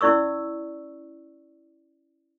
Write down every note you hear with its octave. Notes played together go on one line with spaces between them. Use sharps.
C#4 E4 D5 C#6 E6